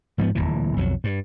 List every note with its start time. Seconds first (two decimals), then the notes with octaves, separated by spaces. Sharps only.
0.18 G#2 F3 A3 B3
0.35 D1 A#1 A#2 E3
0.77 B1 F2 E3 F#3
1.04 G2